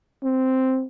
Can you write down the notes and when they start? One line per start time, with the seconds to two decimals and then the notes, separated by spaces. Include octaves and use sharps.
0.23 C4